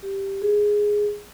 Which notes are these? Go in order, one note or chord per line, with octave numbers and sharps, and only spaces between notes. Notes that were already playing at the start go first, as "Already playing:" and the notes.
G4
G#4